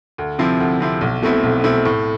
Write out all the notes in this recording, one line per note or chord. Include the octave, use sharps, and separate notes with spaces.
D2
C3 F3 C4 E4
D2
C3 F3 C4 E4
B1
B2 A3 C4 E4
B1
B2 A3 C4 E4
A2